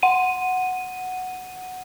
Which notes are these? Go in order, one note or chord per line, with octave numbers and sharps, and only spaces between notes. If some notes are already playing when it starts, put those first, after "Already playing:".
F#5 D#7